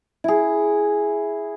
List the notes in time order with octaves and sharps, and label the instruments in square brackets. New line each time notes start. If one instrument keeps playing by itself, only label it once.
[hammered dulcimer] E4 G#4